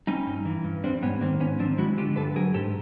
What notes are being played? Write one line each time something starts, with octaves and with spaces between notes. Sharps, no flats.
G3 C#4 D#4
G2
E3
G2
G3 C4 D4
G#2 B3 C#4
D#3 A#3 C4
G#2 B3 C#4
F3 C4 D4
G#3 E4 F#4
D3 F4 G4
G2 A4 B4
F#3 G#4 A#4
G#2 G4 A4